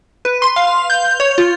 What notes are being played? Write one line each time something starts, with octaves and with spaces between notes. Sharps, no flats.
B4
C6
F5
G6
C#5
F4